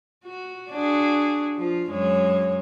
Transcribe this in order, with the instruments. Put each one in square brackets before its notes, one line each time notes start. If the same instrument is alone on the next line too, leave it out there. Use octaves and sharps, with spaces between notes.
[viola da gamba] F#4
D4 F#4 G#4
F3 F4
F#2 G#3 C#5